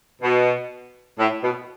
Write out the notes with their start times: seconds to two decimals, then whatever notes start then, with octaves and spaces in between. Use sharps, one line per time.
0.22 B2
1.19 A2
1.43 B2